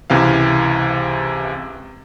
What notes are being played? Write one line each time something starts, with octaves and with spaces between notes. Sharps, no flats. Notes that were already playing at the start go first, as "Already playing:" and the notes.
C#2 C3 E3 F5